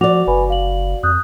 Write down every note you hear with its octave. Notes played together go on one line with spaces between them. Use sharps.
F3 F#4 D5 D6 F7
F#1 B4 G#5 B5
F5 F#7
F2 D#6 F#6 G6